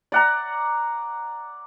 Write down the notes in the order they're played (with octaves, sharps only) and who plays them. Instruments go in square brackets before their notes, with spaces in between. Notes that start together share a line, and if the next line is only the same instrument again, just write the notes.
[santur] D5 F#5 A#5